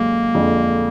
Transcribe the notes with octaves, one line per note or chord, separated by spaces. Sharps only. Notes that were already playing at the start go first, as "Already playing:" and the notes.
Already playing: F#2 D3 G#3 A#3 F#4
F2 D3 G#3